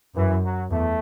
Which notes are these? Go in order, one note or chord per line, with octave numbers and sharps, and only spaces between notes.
F#2 E3
F#3
E2 A3